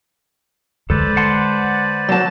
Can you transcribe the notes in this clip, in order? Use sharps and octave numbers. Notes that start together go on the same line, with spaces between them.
D3 G#3 A4 B4 C5 D5
F#5 A5 C6
F#3 A5